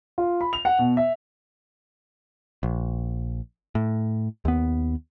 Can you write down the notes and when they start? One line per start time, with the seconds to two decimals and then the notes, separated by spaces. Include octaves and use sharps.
0.18 F4
0.41 B5
0.53 F7
0.65 F#5
0.79 B2
0.97 E5
2.63 A#1
3.75 A2
4.45 D#2 B3